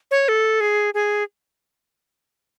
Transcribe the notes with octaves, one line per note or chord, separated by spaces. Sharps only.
C#5
A4
G#4
G#4